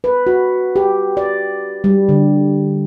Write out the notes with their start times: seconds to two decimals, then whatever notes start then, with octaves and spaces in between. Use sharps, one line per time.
0.04 B4
0.27 F#4
0.76 G4
1.17 D5
1.84 G3
2.09 D3